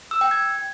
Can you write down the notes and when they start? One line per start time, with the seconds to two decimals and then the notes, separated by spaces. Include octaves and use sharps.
0.11 E6
0.21 G5
0.31 G#6